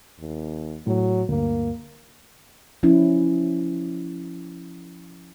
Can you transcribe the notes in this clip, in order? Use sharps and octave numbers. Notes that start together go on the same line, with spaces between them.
D#2
A2 F#3
D2 G2 A#3
F3 C#4 E4